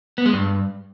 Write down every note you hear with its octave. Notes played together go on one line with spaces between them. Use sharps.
B3
G#3
G2